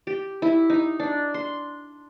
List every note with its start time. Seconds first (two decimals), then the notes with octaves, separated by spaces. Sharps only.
0.07 G4
0.42 E4
0.70 D#4
1.00 D4
1.34 C6